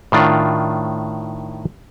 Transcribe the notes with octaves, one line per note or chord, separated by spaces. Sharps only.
A2 D#3 D4 F4